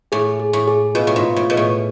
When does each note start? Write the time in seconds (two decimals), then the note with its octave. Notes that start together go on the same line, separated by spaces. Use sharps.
0.12 A2 G#4
0.40 G#4
0.53 A2
0.68 G#4
0.95 B2 F4
1.07 A2
1.16 G#2
1.23 F4
1.36 A2
1.50 B2 G#4
1.57 A2